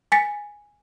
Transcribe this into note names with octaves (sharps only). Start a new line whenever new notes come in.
G#5 A6 B6 C#7